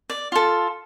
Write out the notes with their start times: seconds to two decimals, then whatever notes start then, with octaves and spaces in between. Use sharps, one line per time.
0.10 D5
0.32 F4 A4